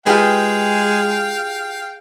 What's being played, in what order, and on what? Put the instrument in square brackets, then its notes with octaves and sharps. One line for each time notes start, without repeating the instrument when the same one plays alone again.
[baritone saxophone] G#3 [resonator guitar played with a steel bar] F4 G4 B4 [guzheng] G#4 [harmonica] F5 G5